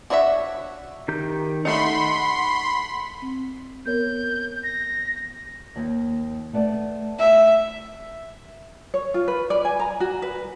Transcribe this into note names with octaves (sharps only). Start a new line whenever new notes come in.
D4 F#4 C#5 D#5 E5
D#3 G4 G6
A3 D#4 F#5 B5 C6
C4
B3 A#4 C#5 G6
A#6
D#2
A3 B3 D5
E5
C#5
F4
B4
D5
G#5
A#5
F#4
B4